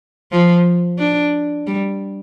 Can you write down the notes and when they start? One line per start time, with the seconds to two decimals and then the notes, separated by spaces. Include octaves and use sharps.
0.32 F3
0.99 D4
1.67 G3